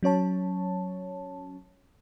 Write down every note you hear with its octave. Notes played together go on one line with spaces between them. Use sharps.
F#3 C#4 C#5 A5